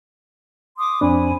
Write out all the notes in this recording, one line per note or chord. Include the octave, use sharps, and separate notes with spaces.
C6 D6 D#6
F2 C4 D4 G#5 B5